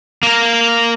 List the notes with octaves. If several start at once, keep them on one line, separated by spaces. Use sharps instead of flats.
A#3 A#4